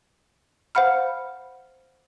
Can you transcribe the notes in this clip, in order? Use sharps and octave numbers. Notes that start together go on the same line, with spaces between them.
C5 F5 F#5 B5 F6